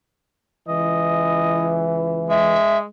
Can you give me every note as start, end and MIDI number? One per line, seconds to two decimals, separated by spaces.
0.69 2.58 37
0.69 2.58 52
0.69 1.76 75
2.30 2.85 56
2.30 2.78 76